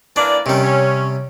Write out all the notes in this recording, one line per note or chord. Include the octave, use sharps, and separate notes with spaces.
E3 A#3 D4 D5
C3 D#3 G3 C#4
C#4